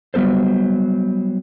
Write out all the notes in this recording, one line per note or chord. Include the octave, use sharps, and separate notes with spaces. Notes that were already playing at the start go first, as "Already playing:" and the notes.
F#3 G3 B3 A4 C5